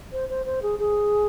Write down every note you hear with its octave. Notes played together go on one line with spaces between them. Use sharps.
C5
C5
C5
G#4
G#4